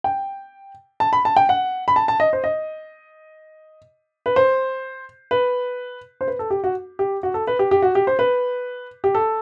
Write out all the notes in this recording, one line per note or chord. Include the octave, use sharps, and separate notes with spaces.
G5
A5
B5
A5
G5
F#5
B5
A5
A5
D#5
C5
D#5
B4
C5
B4
C5
B4
A4
G4
F#4
G4
F#4
A4
B4
G4
G4
F#4
G4
C5
B4
G4
A4